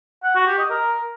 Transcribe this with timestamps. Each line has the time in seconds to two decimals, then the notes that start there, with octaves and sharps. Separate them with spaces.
0.24 F#5
0.35 F#4
0.47 G4
0.58 D#5
0.70 A#4